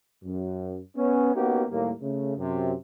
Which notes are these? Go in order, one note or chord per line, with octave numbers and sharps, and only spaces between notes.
F#2
B3 C#4
A#3 B3 C#4 D#4 F#4 G4
D#2 A2 G3 A#3
C#3 A3
F#2 C3